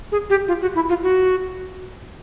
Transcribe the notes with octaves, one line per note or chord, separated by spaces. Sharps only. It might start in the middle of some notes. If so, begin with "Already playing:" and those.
G#4
G4
F4
F#4
E4
F4
F#4